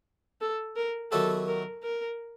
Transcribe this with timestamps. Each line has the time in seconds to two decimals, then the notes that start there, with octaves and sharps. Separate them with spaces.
0.41 A4
0.76 A#4
1.12 D#3 F#3 B3 E4 G4 A4
1.48 A#4
1.83 A#4